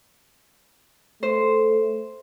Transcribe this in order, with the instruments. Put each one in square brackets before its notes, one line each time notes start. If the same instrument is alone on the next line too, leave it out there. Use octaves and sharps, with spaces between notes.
[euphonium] A3 [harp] C5